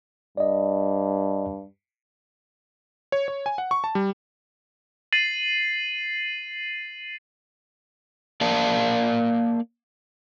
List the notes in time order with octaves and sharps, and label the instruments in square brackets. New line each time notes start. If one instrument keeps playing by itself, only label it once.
[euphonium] G2 [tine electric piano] D5 D#5
[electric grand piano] C#5
C#5
G#5
F#5
C#6
A5
G3
[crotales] A6 C7 D#7 F#7
[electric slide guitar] A#3 A#4 D5 F5 A5